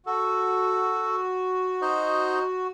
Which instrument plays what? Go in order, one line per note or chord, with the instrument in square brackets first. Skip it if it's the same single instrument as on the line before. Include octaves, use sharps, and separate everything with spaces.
[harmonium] F#4 [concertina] A4
[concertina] D#4 C5 D#5